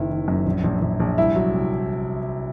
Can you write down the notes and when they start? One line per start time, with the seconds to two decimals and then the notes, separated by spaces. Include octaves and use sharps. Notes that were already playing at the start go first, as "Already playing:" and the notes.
Already playing: F#1 D#3 E4
0.10 D#3
0.28 F#2
0.46 A#1
0.64 A#1
0.82 A#1
1.00 A#1
1.18 C2 E4
1.36 F#3
1.54 C2